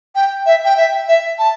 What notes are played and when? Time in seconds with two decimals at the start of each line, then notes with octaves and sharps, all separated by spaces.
0.15 G5
0.46 E5
0.65 G5
0.77 E5
1.08 E5
1.39 A5